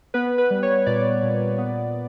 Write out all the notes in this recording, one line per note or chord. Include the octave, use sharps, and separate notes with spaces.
B3 B4
B4
G3
C#5
A#2 D5
A#2
B3